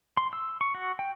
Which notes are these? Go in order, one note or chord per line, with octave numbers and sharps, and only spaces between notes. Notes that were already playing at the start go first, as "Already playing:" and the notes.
C6
E6
C#6
F#4
G5